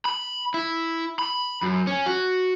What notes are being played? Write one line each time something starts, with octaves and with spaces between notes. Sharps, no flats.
B5
E4
B5
F#2
C#4
F#4